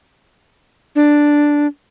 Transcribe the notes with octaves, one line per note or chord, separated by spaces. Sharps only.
D4